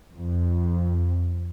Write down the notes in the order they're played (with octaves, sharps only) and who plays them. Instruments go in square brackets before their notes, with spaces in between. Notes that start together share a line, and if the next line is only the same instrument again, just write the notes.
[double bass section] F2